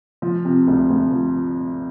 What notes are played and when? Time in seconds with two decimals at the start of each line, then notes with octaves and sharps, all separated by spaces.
0.22 F3
0.45 C3
0.67 D2
0.90 D2
1.13 F3